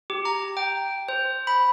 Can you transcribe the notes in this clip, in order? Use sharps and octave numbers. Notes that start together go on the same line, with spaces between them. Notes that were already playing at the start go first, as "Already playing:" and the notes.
G4
A#5
G5
C5
B5